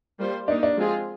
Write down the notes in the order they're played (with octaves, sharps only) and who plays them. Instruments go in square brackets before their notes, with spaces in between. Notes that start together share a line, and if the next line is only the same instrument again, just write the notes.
[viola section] G3 A#3 F4 C5
[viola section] A#3 D#4 G4 [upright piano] D4
[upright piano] D4
[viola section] F3 G#3 C4 F4 G#4